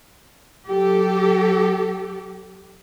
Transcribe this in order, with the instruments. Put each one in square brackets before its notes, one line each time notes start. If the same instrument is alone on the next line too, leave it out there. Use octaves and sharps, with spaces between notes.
[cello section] F#3 G4 A4